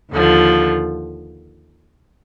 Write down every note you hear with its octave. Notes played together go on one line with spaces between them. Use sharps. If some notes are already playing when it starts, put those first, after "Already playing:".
D#2 D3 F3